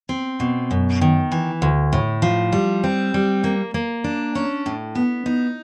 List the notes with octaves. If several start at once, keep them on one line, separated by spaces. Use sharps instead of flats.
C4
B2
F#2
D#3
E3
D2
A2
F3
G3
C4
G3
A#3
A#3
D4
C#4
A2
B3
D#4